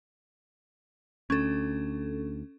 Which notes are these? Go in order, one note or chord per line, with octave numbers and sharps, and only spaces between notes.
D2 C#4 A4